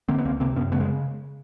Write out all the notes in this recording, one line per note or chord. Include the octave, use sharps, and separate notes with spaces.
D3 A#3 C4
B3
C#2 A#3 C4
C3 A#3 C4
F#2 B3 C#4
C#3 A3 B3
G#3